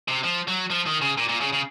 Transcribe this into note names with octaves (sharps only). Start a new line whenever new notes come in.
C3
F3
F#3
F3
D#3
C#3
A#2
A#2
C#3
C#3